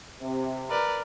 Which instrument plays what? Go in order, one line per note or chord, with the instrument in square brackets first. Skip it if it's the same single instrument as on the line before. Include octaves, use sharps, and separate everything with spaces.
[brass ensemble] C3
[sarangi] A#4 [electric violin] B4 D5